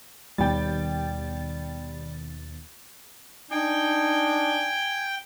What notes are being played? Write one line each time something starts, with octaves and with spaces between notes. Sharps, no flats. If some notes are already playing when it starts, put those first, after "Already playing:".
D#2 B2 G3 G5 A6
D4 D#4 G5 G#5